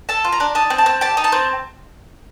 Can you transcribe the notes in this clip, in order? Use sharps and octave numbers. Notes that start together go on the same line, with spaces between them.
A4 A5
F4
A#5
D4
D#4 A5
C4
A5
C4
G4 A5
D#4
A5
C4